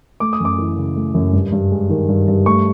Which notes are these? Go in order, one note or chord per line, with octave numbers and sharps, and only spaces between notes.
A3 D6
D#6
F#2 D6
E3
C#3
A3
F#2
G2
G2
G#3
D#3
G2
G2
A3 C#6